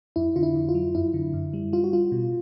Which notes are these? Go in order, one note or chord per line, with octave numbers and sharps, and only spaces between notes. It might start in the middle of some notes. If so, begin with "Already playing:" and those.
F2 E4
D3 F4
E4
F2
F4
F#3
F#2 E4
D3
F#2
G3
G3 F4
F#4
G3 F4
B2